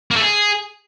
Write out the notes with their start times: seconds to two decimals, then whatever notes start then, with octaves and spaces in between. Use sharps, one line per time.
0.11 A#3
0.16 A3
0.21 G#4